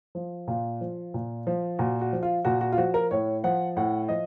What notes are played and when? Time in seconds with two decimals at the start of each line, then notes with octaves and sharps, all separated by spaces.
0.15 F3
0.47 A#2 F4
0.81 F3
1.14 A#2
1.47 F3
1.79 A#2 F#4
2.01 F#4
2.13 F3
2.23 F4
2.45 A#2 F#4
2.61 F#4
2.72 F4
2.78 F3 F#4
2.94 A#4
3.11 A2 C#5
3.44 F3 F#5
3.77 A2 F#5
4.09 F3 D#5